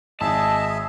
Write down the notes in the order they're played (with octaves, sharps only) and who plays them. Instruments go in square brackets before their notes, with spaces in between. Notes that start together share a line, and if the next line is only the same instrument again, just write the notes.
[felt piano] G#1 [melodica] G#4 E5 [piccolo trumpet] D#5 [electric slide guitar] A5